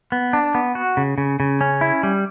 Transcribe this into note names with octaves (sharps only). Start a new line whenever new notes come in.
B3
D4
B3
F#4
C#3
C#3
C#3
C#4
E4
G3